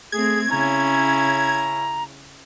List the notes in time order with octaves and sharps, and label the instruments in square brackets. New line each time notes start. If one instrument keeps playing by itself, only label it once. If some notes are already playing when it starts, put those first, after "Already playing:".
[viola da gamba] A3 C4 [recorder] G#4 [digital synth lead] G#6
[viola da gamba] C#3 [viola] C#4 E4 [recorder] A#5